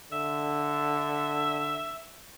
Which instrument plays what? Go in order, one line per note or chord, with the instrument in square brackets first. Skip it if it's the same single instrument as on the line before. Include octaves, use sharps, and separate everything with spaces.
[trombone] D3 [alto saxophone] E5